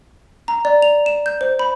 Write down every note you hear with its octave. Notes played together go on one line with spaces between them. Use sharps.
A#5
D5
F7
E7
G6
C5
B5